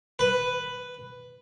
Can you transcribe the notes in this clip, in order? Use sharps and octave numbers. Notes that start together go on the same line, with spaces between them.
B4